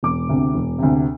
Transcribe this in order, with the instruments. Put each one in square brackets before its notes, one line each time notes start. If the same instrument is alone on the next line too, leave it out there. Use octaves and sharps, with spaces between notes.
[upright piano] E1 D6
D2 C3
E1
D2 C3